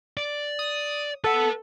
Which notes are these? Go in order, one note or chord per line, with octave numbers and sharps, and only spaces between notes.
D5
D#6
A4 B4 F#5